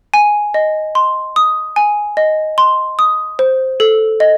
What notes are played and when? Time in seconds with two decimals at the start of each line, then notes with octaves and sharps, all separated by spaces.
0.14 G#5
0.54 D#5
0.95 C6
1.36 D#6
1.76 G#5
2.17 D#5
2.58 C6
2.99 D#6
3.39 C5
3.80 A4
4.20 D#5